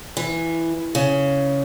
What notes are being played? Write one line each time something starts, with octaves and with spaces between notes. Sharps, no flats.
E3
C#3